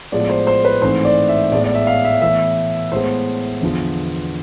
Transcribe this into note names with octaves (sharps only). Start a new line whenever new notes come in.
A2 F3 G#3 B3 D5
C5
C5
B4
G#2 E3 A3 C4 C5
D5
E5
A2 G#3 B3 D5
D5
E5
F5
E5
A2 E3 B3 E5
A2 G#3 B3 C5
E2 D3 F3 B3